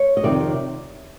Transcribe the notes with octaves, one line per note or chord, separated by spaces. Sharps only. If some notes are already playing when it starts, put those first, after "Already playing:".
Already playing: C#5
D#5
F2 C3 D#3 D5